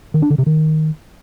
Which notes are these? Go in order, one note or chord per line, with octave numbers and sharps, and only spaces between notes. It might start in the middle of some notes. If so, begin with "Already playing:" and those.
D#3
D4
D3
C3
D#3